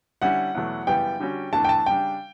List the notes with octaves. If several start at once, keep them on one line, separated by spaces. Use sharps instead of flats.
D3 G3 C#4 E4 F#5
E2 B2 F#3 A3
F#2 C#3 E3 G3 B3 G5
D3 G3 C#4 F#4
E2 D3 A3 A5
G5
A5
C#3 G3 D4 G5